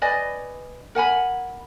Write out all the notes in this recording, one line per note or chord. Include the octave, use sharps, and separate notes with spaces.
B4 D5 D#5 G#5
A#4 F#5 G#5 B5